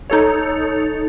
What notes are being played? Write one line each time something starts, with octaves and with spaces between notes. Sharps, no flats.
D#4 A4 C#5